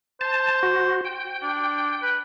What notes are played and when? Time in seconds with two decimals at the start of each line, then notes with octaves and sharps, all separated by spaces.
0.21 C5 A5
0.63 F#4
1.05 G5
1.42 D4
2.02 B4